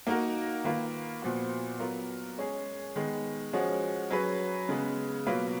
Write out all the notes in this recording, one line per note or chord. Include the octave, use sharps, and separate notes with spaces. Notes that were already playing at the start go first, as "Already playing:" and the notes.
A#3 D#4 F#4 A#4
D#3 A#3 F4 B4
A#2 F3 B3 F#4
F#3 B3 F4 A#4
G#3 C#4 G#4
D#3 G#3 B3
F3 G#3 C#4 F#4
F#3 C#4 G#4 B4
C#3 G#3 B3
B2 F#3 A#3 F4 B4